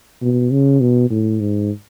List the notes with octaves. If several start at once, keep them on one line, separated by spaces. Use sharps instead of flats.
B2
C#3
B2
A2
G#2